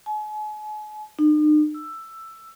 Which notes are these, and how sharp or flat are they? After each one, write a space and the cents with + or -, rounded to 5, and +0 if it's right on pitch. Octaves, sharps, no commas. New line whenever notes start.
G#5 +40
D#4 -45
E6 +10